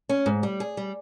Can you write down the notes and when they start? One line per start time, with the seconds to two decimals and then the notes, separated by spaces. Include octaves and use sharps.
0.09 C#4
0.26 G#2
0.43 G3
0.60 G#4
0.77 G3